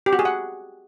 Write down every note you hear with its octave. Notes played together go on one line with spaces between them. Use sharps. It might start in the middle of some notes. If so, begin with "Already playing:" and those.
G4
F#4
G#4
F#5